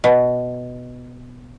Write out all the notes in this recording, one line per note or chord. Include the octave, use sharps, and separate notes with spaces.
B2